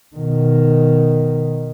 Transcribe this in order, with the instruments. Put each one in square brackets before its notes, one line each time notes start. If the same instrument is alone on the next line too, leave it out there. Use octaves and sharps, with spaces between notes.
[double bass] B2 D#3